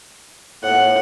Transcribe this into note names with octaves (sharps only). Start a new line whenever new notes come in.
A2 F#5